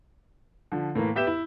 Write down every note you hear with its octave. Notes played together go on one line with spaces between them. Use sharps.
D3 F3
A2 E3 A#3
B3 G4 E5 G6 E7
E4